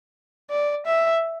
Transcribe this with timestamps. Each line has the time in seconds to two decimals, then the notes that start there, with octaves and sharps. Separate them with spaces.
0.50 D5
0.86 E5